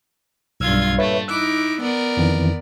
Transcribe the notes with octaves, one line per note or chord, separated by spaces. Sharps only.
B1 G2 F4 E6 F6 G#6
A#2 A3 B4 C#5 E5
D#4 E4 D6 E6 F#6
B3 A#4 D5
F2 D#3 E3